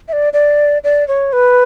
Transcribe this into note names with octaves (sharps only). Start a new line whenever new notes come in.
E5
D5
D5
D5
C#5
B4